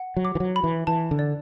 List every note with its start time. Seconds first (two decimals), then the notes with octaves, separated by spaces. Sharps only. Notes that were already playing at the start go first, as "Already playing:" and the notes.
Already playing: F#5
0.17 F#3
0.25 D6
0.35 E3
0.40 F#3
0.56 B5
0.64 E3
0.87 E3 A5
1.11 D3
1.19 D5